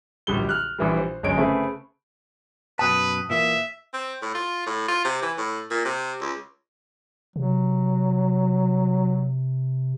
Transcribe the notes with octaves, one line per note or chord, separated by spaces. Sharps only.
D1 A#1 G3 G7
F6 F#6
A#1 E3 G3
C5
G1 F#2 G#3 C#5 D7
C#3 A3 C4 G#4 B4
F#2 B2 B4 G5 A5 D#6 F#6
A#2 E3 A#3 E5
C4
A2
F4
A2
F4
C3
E3
A2
A#2
C3
C#2
C3 F#3